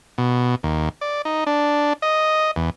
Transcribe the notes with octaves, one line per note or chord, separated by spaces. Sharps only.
B2
D#2
D5
D#4
D4
D#5
E2